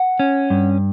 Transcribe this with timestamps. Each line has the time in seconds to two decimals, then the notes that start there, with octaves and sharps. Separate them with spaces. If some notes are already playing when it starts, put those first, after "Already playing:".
Already playing: F#5
0.20 C#4
0.50 G2